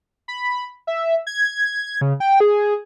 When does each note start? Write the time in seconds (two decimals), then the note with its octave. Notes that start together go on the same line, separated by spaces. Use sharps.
0.28 B5
0.87 E5
1.27 G#6
2.01 C#3
2.20 G5
2.40 G#4